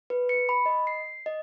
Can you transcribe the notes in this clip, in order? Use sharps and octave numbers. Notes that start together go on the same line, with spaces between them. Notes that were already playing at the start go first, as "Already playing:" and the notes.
B4
C#7
B5
D#5
C7
D#5